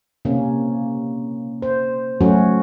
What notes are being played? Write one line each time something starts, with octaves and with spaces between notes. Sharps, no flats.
C3 A#3 C#4
C5
F#3 A3 C#4 F#4